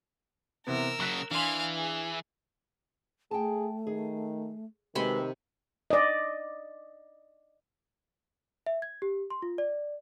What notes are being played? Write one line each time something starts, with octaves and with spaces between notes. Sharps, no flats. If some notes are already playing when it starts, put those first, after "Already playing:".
C3 E3 B3 A#4 E6
C#3 F#3 C#6 F#6 B6
E3 D4 F5 G#5 C6
G#4
A3 G#4 G5 A5
D#3 G#4
C3 D#3 G#3 F#4 B4 D#5 B5 C6
D5 D#5
E5
G#6
G4
C6
F4
D5